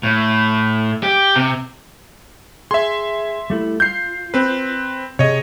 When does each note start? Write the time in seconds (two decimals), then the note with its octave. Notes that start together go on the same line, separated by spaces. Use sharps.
0.03 A2
1.03 G4
1.36 C3
2.71 G#4 E5 C6
3.50 G3 A3 E4
3.80 F4 G6 C7
4.34 C4 B4
5.19 C3 G#4 C#5 D#5